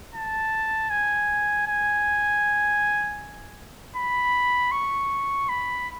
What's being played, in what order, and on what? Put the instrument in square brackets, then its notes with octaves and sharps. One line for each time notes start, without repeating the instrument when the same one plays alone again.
[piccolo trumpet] A5
G#5
G#5
B5
C#6
B5